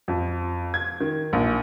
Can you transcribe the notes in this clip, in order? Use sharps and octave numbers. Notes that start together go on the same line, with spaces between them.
F2
G#6
D#3
A#1